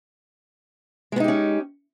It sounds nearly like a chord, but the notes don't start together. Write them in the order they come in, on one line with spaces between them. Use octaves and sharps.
G#3 B3 D#4 G4 C#4